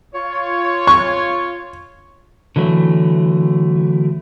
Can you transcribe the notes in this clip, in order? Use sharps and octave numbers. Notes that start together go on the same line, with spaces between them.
F4 C#5
C#6
D3 E3 F#3 A3